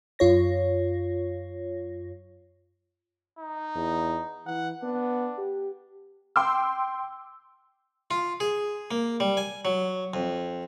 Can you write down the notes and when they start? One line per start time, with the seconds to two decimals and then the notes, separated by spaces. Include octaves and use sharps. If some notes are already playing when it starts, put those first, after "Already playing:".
0.19 F#2 F4 C#5 A#6
3.39 D#4
3.76 E2
4.46 E3 F#5
4.83 B3 D4
5.38 G4
6.36 G5 C6 D6 E6
8.11 F4
8.40 G#4
8.91 A#3
9.20 G3
9.37 G#5
9.65 F#3
10.14 F2